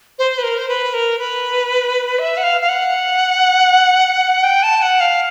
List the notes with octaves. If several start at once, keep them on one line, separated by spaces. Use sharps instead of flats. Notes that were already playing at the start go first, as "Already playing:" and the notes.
C5
B4
A#4
C5
B4
A#4
B4
E5
F#5
F5
F5
F#5
G5
A5
F#5
F5